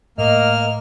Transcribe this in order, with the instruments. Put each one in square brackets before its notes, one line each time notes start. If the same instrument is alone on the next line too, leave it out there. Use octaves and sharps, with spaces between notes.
[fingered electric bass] A2 [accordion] A#3 F6 [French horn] D#5